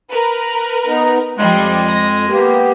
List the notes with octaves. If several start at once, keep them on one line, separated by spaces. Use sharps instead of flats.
A#4 B4
B3 D#4 A#5
F2 F3 G3 G#3
A#6
A#3 B3 G4